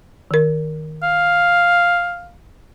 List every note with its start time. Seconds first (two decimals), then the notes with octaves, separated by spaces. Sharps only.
0.31 D#3 A#4
1.03 F5